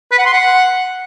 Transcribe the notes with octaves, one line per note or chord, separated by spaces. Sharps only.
B4
F#5
C6
F#5